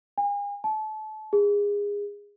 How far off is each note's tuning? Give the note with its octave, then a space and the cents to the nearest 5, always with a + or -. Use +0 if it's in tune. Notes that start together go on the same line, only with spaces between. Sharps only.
G#5 -40
A5 -30
G#4 -25